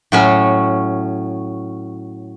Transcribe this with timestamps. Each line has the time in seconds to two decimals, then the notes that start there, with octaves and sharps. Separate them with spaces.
0.12 A2 F#3 C#4